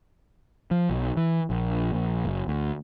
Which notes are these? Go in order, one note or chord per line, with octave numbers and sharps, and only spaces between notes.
F3
B1
E3
A#1
A#1
F#1
D2